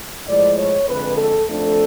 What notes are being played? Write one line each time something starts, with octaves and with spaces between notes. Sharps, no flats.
A2 F3 G#3 D5
C#5
F2 D3 G#3 B4
A4
F2 F3 A3 D4 A4